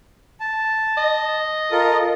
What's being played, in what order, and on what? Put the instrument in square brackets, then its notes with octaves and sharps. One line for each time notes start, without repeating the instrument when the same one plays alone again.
[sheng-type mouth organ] A5
[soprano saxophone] D#5
[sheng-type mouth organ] F4 A4 A#4